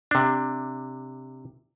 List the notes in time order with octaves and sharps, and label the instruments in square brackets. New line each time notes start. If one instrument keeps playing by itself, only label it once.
[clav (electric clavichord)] C3 D4